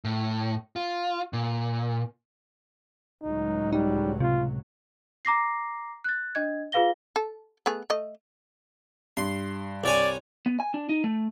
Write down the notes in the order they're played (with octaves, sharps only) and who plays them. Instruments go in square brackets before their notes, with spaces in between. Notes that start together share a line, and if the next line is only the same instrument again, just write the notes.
[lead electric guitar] A2
F4
A#2
[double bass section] C#2 A2 F#3 [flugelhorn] D#4
[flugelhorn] G3 [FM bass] D#4
[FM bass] C3 [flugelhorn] F4
[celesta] A#5 D6 A#6 C7
F#6 A6
D4 D#5 G#6
F4 G#4 B4 F5 A#6 G7
[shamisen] A4
A3 B3 G#4
A3 D#5
[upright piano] G2 [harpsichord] C6
[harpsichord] C2 C#5 G#5 [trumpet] D5
[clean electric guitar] B3
G#5
D4
D#4
A3